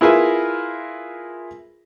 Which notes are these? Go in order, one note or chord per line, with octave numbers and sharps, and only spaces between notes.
E4 F4 G#4 A#4 B4 E5